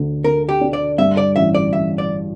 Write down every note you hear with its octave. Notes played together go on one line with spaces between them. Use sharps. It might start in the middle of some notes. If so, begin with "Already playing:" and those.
Already playing: D2 D3
D3 A#4
G4
D4
D5
G2 E5
D5
A1 E5
D5
A1 E5
D5